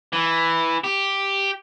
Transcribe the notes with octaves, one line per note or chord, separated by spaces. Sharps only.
E3
G4